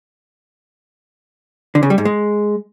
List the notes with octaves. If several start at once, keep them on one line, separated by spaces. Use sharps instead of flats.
D3
C#3
G3
G#2
G#3